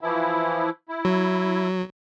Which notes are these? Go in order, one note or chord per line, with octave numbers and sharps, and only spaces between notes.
E3 F3 E4
E4
F#3